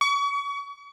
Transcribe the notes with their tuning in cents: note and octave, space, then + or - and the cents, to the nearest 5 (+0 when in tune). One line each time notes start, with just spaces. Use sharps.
C#6 +35